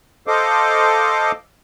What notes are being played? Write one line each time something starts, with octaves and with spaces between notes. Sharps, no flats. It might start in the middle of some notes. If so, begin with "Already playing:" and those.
A4 C5 D#5 F5 D6